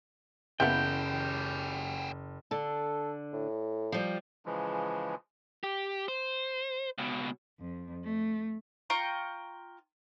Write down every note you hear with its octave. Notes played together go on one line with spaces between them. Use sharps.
F#1 E3 A#3 B3 C#4 G4 G5
D3 A4
A2
F3 G3
C#3 E3 F3 G#3
G4
C5
C#2 B2
F2
A3
F4 G5 A#5 C#6